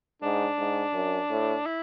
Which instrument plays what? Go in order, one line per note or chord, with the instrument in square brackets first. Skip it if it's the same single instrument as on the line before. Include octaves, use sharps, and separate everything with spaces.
[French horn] G#2 [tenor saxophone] D4
[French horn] G#2
F#2
A2
[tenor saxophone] E4